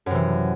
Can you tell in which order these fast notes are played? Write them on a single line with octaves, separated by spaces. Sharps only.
F#2 C3 E3